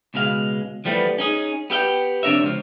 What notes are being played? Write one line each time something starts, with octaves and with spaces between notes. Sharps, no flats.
C#2 B2 G#3 F5
E2 F3 G3 A3 B3
C#4 D#4 G#4
B3 G4 E5 G5
F2 C3 D4 A#4 C#5 E5
C#2 F3